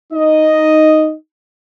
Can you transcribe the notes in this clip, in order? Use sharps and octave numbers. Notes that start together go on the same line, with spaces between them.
D#4 D#5